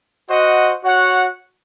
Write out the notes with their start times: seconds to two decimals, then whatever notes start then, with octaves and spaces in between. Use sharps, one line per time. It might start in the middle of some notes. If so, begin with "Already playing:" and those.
0.27 F#4 C5 D#5 F#5
0.82 F#4 C#5 F#5